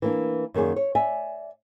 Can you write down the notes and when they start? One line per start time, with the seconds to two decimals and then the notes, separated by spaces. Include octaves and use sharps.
0.02 E3 A#3 D4
0.54 F#2 D#3 A#3 G#4 D5
0.76 C#5
0.95 D5 E5 G#5